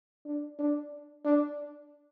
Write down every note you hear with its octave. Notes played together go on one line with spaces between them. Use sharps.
D4
D4
D4